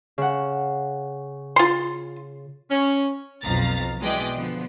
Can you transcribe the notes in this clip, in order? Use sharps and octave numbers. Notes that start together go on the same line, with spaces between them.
C#3 F#5
F4 C6
C#4
B1 F2 F5 A#5 A6
B2 E3 G#3 D5 D#5 G5
D3 F3 B3